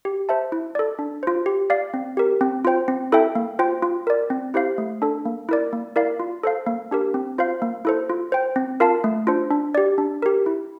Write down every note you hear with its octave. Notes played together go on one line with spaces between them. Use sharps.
G4
C5 E5 A5
E4
A4 D5
D4
F4 C5
G4
D5 F5
C4
G4 A#4
C4
F4 C5 G5
C4
E4 A4 E5 G5
A#3
F4 C5 G5
F4
A#4 D5
C4
E4 G4 C5 F5
A3
D4 A4
A#3
E4 A#4 D5
A#3
E4 A#4 D5 F5
F4
A4 C5 F5
A#3
D4 G4 A#4
C4
F4 C5 F5
A#3
E4 A4 C5
F4
C5 G5
C4
F4 A#4 F5 A5
A3
D4 F4 C5
D4
G4 D5
D4
G4 A#4
E4